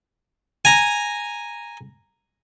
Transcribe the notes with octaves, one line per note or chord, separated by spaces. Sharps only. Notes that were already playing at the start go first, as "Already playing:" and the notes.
G#5 A#5